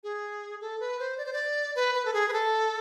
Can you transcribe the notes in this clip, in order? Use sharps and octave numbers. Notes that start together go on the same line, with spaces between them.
G#4
A4
B4
C5
D5
C5
D5
B4
B4
A4
G#4
B4
A4